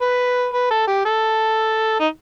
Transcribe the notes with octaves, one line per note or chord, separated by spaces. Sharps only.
B4
B4
A4
G4
A4
D#4